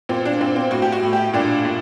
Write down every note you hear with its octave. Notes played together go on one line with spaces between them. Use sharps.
A#2 C4
D4
A#2 C4
C4
A2 F#4
G4
F#4
A2
G4
A#2 D4
A#2